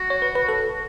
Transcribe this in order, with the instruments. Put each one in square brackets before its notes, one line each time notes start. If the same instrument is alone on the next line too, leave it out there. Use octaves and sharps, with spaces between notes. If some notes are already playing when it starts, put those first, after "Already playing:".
Already playing: [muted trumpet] F#4
[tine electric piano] C#5
B4
B4
A4